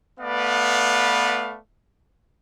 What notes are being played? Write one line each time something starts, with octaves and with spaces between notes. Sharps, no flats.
A3 B3 B4 D5 F5